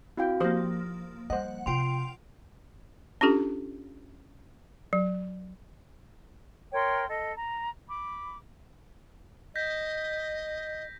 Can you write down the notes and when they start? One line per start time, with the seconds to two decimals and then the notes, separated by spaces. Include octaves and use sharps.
0.17 C4 E4 F#4 F5 G5
0.40 F3 A#3 G4 C5 D#6
1.30 G3 C5 D#5 F#5
1.66 C3 F4 G5 C6 D7 F7
3.21 C#4 D4 F4 G4 A4
4.93 F#3
6.73 A#4 C#5 G5 C6
7.08 A4 D#5
7.36 A#5
7.88 B5 D6
9.56 D#5 G6 A#6 B6